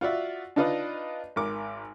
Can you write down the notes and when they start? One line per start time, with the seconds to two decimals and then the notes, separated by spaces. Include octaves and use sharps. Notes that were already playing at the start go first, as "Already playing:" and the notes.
0.01 F4 F#4 D5 E5
0.56 D4 D#4 F4 B4 D5 D#5
1.36 G#1 A#4 D6